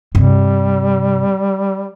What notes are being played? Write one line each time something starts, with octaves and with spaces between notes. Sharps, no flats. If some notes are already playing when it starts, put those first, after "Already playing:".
G2 C3 G3